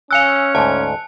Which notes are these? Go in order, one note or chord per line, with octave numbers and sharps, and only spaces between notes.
C#4 F5 G#5 E6 F#6 C#7 F7
D2 G#2 A5